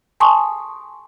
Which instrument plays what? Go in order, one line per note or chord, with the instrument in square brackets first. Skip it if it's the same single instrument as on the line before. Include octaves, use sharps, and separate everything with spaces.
[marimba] G#5 A5 C6 C#6 D#6